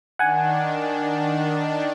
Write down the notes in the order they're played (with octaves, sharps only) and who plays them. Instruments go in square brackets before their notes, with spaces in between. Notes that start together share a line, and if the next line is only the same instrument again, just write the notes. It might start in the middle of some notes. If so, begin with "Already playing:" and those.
[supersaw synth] D#3 D4 [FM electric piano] F#5 G#5